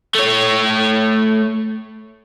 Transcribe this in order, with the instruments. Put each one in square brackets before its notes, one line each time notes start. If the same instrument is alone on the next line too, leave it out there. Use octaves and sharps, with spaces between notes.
[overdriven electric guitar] A3 C#5